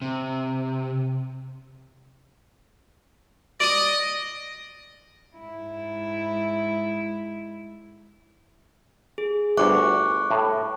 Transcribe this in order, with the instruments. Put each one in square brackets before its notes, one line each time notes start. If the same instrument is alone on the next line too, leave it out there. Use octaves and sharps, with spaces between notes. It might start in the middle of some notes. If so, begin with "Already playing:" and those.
[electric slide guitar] C3
[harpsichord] D5 D#6 [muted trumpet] D#5
[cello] G#2 E4
[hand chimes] G#4
[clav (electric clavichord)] G1 D2 [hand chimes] C#6 D6 F#6
[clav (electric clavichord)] A2